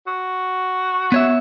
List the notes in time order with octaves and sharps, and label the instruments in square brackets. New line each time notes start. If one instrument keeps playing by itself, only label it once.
[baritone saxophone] F#4
[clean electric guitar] B3 C#5 E5